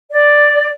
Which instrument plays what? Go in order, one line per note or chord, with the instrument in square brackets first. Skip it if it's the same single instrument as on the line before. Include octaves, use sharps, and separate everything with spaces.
[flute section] D5